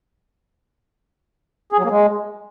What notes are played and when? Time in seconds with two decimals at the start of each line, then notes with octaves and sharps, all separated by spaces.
1.72 G#4
1.78 F#3
1.85 A#3
1.91 G#3